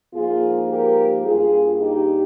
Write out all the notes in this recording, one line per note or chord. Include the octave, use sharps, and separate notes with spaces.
G#2 F3 A#3 F4 G#4
G4 A#4
G2 G3 A#3 F4 G#4
D#4 G4